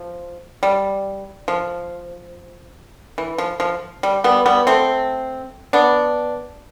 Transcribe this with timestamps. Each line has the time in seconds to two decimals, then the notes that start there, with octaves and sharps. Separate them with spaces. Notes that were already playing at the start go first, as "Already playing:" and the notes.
Already playing: F3
0.63 G3
1.48 F3
3.18 E3
3.38 F3
3.60 F3
4.03 G3
4.24 G3 B3
4.46 G3 B3
4.67 A3 C4
5.73 B3 D4